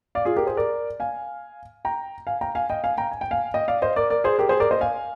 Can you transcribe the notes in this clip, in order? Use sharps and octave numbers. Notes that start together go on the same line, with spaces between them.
D5 F5
F4 G#4
G4 A#4
G#4 C5
A#4 D5
F5 G#5
G5 A#5
F5 G#5
G5 A#5
F5 G#5
D#5 G5
F5 G#5
G5 A#5
G#5
G5
F5 G#5
D#5 G5
D5 F5
C5 D#5
A#4 D5
A#4 D5
G#4 C5
G4 A#4
G#4 C5
A#4 D5
C5 D#5
F5 G#5